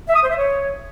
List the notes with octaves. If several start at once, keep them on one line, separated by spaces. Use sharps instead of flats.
E5
D#6
C5
E5
C#5